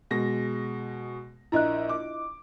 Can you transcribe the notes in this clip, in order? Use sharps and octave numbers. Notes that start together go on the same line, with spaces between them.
B2 G#3 A#6
A#1 E4 D#5 A#5 F#6
D6